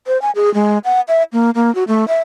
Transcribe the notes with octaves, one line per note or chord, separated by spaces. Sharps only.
C5
G#5
G#4
G#3
F#5
E5
A#3
A#3
F#4
A3
E5